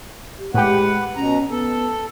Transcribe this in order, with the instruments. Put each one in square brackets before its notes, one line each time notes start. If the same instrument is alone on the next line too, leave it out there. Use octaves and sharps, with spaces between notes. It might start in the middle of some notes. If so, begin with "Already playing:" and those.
[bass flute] G4
[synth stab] A2 G4 [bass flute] G#3 [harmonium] B4 F#5
[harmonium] B2 A#5 [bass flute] C#4
[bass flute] B3 [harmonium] A4